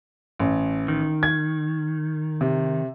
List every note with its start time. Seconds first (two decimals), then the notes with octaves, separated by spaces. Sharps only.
0.40 A1
0.88 D#3
1.23 G#6
2.41 C3